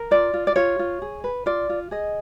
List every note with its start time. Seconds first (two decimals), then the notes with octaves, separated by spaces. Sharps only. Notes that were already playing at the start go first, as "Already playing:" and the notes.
Already playing: A#4
0.11 F4 D5
0.34 F4
0.47 D5
0.56 F4 C#5
0.79 F4
1.02 G#4
1.24 B4
1.46 F4 D5
1.69 F4
1.91 G#4 D#5